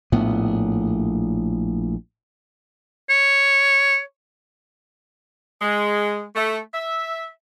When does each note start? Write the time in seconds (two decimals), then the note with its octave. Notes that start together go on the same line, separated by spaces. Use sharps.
0.12 A#1 A2 B3
3.10 C#5
5.61 G#3
6.35 A3
6.73 E5